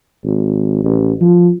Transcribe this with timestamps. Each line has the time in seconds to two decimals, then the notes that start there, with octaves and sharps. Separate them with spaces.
0.24 G#1
0.84 A1
1.21 F3